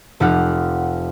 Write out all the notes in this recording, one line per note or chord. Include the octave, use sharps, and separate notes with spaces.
F1 F3 G4 F#5 F6